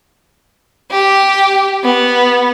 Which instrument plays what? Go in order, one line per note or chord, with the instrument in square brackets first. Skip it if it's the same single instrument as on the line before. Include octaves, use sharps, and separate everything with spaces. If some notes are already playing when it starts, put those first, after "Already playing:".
[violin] G4
B3